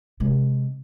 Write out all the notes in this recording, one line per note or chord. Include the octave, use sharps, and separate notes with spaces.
C3 G#3